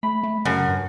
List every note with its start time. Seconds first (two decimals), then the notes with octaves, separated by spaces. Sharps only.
0.03 A3 B5
0.23 A3
0.45 F#2 C#3 A5 A#6
0.68 G2